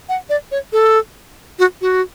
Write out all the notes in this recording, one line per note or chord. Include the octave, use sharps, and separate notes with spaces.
F#5
D5
C#5
A4
F#4
F#4